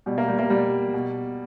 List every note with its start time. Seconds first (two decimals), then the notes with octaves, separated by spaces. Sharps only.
0.06 B2 G3
0.18 A#3
0.28 G3
0.39 A#3
0.50 B2 G3
0.94 B2